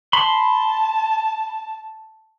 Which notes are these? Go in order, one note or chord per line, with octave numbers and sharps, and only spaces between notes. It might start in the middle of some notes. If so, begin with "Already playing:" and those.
A5 B5 C6